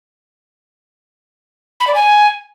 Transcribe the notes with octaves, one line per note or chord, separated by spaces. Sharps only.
B5
D5
G#5